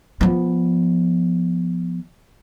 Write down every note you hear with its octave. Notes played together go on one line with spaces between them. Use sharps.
F3 B3